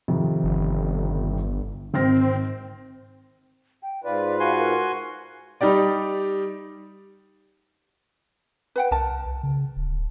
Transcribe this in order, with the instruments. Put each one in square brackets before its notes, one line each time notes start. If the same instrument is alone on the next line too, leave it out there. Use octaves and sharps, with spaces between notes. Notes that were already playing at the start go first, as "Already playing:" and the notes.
[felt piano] F2 C3 D#3
[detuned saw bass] G1
[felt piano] G#1 F6 A#6 [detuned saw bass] C4
[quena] G5
[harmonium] G#2 F4 B4 [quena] D5
[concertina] F#4 G#5 C6 [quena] F5
[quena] A#4
[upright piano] G3 D#4 G4 D5
[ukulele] B4 F#5 G5
[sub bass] C2 [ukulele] A#4 A5
[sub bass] C#3
D1